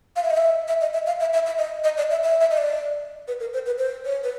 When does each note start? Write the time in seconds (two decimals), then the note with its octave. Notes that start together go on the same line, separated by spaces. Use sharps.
0.16 F5
0.23 E5
0.30 D#5
0.37 E5
0.68 E5
0.81 D#5
0.93 E5
1.07 F5
1.20 E5
1.33 E5
1.46 E5
1.58 D#5
1.84 D#5
1.97 D5
2.10 E5
2.23 E5
2.41 E5
2.51 D#5
2.57 D5
3.28 B4
3.40 A#4
3.54 C5
3.66 B4
3.78 C5
4.05 C#5
4.24 B4